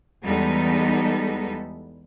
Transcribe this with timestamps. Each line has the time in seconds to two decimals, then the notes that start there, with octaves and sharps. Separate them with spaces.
0.24 E2 G3 G#3 B3 D#4 A4